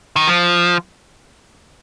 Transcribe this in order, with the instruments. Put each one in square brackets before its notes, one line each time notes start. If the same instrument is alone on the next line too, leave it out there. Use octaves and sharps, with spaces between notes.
[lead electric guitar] D#3
F3